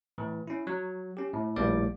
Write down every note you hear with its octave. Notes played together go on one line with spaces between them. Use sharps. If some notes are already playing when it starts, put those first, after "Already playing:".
A2 E3
C#4 E4
F#3
C#4 G4
A2
A#1 A2 G3 A#3 D5 D6